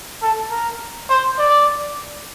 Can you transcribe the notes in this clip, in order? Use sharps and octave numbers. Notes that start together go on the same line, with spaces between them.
A4
A#4
C5
D5